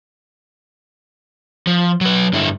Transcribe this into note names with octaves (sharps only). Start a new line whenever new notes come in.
F3
F#3 B4
G2 D3 E4